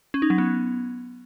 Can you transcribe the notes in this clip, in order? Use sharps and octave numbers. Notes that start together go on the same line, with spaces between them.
C#4
D#4
F#3
B3